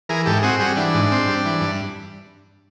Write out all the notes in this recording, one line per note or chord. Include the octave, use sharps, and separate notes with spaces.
E3 G#4 A#4
G#2 G4 A4
C4 F#4 G#4
G3 F#4 G#4
E3 D4
G#2
C4
G3
E3
G2